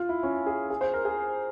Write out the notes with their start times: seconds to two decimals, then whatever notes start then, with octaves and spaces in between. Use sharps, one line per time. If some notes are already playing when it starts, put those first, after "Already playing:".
Already playing: F4
0.09 E4
0.23 C#4
0.46 G#4
0.70 G#4
0.81 C5
0.93 A#4
1.05 G#4